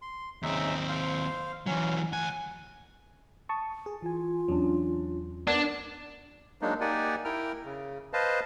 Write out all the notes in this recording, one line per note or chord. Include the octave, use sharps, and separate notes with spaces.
C6
D#2 C#3 C4 D#4 E5
C5 F5
E3 F#3 C#4
D2 F#5 G#5
A5 C#6 D#6
G#4
E3 F4 G#5
E2 F#3 C#4 D4
B3 D4 A#4 F#5 G#6
F#3 G#3 A#3 D4 D#4
A#3 D#4 G4 D5 F#5 G#5
E4 A#4 G5 F6
C#3
B4 C5 D#5 F5 A5